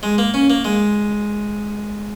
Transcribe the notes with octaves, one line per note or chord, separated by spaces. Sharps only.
G#3
A#3
C#4
A#3
G#3